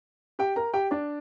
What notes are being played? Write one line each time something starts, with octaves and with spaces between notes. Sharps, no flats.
G4 G5
A#4 A#5
G4 G5
D4 D5